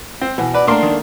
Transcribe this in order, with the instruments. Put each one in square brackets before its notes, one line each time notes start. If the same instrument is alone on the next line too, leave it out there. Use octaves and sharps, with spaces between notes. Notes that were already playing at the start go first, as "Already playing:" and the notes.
[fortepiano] C4
[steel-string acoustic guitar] B2 [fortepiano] E3
[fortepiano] B4 [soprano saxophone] D5
[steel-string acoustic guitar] A3 A#3 [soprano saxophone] D4 [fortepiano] A#4 C6 D6
[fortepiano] D#3